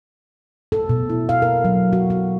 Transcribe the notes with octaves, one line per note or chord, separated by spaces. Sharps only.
A4
B2
E4
F5
A#4
F#3
F#4
F#4